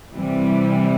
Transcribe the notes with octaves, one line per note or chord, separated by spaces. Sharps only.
C3 E3 G3